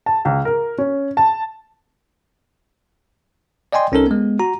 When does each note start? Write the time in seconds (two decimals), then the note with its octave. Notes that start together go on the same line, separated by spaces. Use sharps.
0.06 A5
0.25 C#2
0.45 A#4
0.78 C#4
1.17 A5
3.73 D5 D#5 G5 G#5 C6
3.92 C2 C#4 D#4 A4 A#4
4.07 G#3 B3
4.39 F#4 A#5